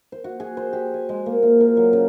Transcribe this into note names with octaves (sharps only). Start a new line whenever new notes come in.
C5
F#4
G#4
C5
G4
G#5
G#3
A#3
F4
A#4
F#3
C#3